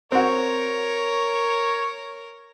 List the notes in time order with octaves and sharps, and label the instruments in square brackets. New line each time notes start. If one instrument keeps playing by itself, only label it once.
[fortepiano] C4 F#4 [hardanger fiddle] A#4 [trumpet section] C#5